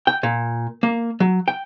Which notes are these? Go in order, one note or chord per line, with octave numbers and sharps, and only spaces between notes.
G5
A#2
A#3
F#3
G5